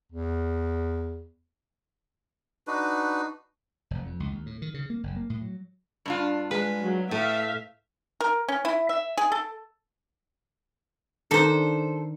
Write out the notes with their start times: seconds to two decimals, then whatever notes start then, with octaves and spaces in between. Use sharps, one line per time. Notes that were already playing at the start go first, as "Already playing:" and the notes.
0.12 E2
2.67 D4 D#4 F#4 B4
3.91 F1
4.06 F2
4.20 C#2
4.31 D#2
4.46 A2
4.62 D#3
4.74 C#3
4.90 A#3
5.03 F#1
5.16 A#3
5.30 A2
5.42 F#3
6.06 G2 D4 F4
6.51 G#3 B4
6.81 F#3
7.11 A2 A3 E5 F5
8.21 A#4
8.48 C#4
8.65 E4
8.89 E5
9.17 G#4
9.32 A4
11.31 D#3 D4 A4 C5